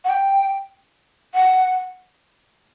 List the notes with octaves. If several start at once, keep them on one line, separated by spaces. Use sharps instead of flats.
F#5
G5
F#5